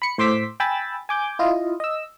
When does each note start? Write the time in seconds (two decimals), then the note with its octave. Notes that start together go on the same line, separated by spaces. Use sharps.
0.02 B5 C#7
0.18 A2 C5 C6 D6 E6 B6
0.60 G5 G#5 B5 E6 A6
1.09 G#5 D6 G6
1.39 E4 F4 D#5
1.80 D#5 E6